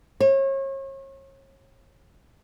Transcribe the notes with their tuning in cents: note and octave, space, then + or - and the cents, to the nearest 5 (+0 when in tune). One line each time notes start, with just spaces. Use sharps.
C#5 -35